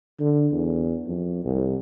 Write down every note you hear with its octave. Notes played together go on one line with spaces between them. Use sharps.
D3
E2
F2
C2